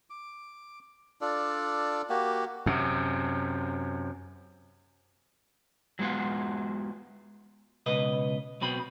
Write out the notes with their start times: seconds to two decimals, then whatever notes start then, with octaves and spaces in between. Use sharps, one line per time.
0.10 D6
1.21 D4 F4 A4 D5
2.10 A#3 F#4 G4
2.66 F#2 C3
5.99 F#3 G#3 B3 F4 F#4
7.86 C#2 B2 B4 D#5
8.61 B1 B2 C4 B5